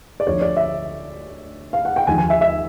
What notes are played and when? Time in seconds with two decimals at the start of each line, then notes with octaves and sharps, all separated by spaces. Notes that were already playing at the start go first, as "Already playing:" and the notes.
0.20 D5
0.27 D2 D3 F3 C#5
0.41 D5
0.57 E5
1.73 F5
1.85 F#5
1.96 G5
2.07 D#2 D3 F3 G#5
2.18 G#5
2.30 E5
2.41 E5